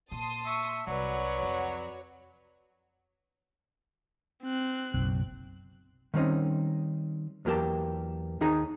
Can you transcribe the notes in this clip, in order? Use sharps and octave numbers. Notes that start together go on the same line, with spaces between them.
A#2 A5 C6 D#6
E5 C#6
C2 F#3 F#4 B4 C#5 D5
F2
C4 F#6
F#1 B1
D#3 G3 C4 C#4 D#4
E2 F#3 A#3 G4 A5
D#2 D#3 D#4 G#4 A#5